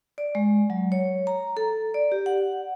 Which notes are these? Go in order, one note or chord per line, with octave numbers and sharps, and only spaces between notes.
D5
G#3
F#3
C#5
A#5
A4
D5
G4
F#5